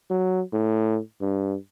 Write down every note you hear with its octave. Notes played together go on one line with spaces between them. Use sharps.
F#3
A2
G2